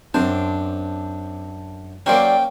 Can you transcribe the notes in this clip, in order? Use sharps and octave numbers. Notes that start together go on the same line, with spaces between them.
F#2 C4 D4 C5
F#3 A#3 C#4 C5 D5 G5